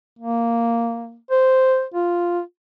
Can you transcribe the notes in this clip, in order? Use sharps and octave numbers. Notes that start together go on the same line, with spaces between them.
A#3
C5
F4